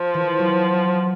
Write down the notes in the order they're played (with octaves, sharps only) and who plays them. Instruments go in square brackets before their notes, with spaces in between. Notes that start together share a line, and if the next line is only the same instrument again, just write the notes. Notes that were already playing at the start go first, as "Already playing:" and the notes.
Already playing: [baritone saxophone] F3
[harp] E3
F#3